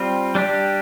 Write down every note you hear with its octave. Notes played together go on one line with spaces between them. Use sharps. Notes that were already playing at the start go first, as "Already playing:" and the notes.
Already playing: G3 C4 F4
G3 D4 G4